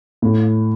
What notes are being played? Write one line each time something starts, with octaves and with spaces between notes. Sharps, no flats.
A2